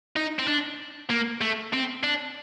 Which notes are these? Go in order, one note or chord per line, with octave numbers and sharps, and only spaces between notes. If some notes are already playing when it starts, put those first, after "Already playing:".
D#4
C4
D4
A#3
A3
C4
D4